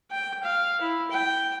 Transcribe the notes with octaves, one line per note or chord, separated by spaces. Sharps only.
G5
F5
E4
G5